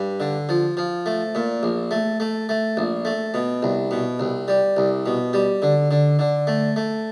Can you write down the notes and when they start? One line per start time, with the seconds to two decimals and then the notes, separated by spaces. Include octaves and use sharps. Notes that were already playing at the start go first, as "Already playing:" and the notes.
Already playing: G2
0.20 D3
0.49 F3
0.77 F3
1.06 A3
1.35 A#2
1.63 A#1
1.91 A3
2.20 A3
2.49 A3
2.77 A#1
3.05 A3
3.34 B2
3.63 C2
3.91 B2
4.19 C2
4.48 G3
4.77 C2
5.06 B2
5.33 G3
5.62 D3
5.91 D3
6.19 D3
6.47 A3
6.76 A3